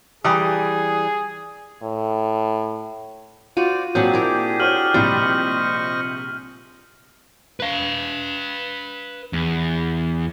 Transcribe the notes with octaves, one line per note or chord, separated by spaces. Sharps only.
E3 G3 G#4 A#5 D#6
A2
F4 F#4 C5 D5 D#7
A#2 F#3 C4 D4 G4 G#4 F#5 G6
E4 A#4
F#4 C5 C#5 F6 D#7 F#7
A#1 C3 G3 C5 D#5 C#6 A6
B4 F5
E2